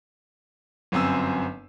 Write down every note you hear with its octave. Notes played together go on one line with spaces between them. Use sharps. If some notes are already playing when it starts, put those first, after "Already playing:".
G1 F#2 C4 G#5 E6